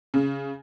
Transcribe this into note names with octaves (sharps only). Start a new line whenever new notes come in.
C#3